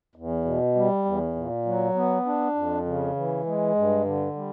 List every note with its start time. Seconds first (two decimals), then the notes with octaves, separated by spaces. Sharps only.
0.16 E2
0.45 B2
0.76 G3
1.05 E2
1.36 A#2
1.66 F#3
1.95 B3
2.26 D4
2.55 F2
2.85 C#3
3.16 E3
3.46 G#3
3.75 G2
4.05 D3
4.36 G3